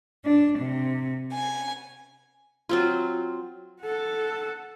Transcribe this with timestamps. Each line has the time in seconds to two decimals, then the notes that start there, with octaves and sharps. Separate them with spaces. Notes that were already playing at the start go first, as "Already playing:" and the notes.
0.23 D4
0.58 C3
1.33 G#5
2.69 F#3 C4 F4
3.81 A4 F#5